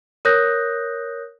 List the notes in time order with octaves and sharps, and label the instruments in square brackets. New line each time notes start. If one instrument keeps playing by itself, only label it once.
[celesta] A#4 C#5 D#6 F#6 G6 A#6